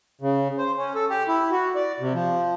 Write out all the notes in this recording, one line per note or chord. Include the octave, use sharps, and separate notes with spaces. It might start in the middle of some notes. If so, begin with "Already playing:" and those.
C#3
C5
C#4
A4
G4
E4
F#4
D5
C3
F3